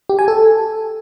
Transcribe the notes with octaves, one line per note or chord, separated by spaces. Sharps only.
G4
G#5
A4